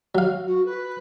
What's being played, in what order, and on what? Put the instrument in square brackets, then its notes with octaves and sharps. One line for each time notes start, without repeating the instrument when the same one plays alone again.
[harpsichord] F#3 F5
[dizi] F#4
B4